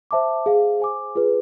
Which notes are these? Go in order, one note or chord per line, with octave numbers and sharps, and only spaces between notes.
C5 E5 A5 D6
G#4 C5 F5
C5 G#5 D6
F4 G#4 B4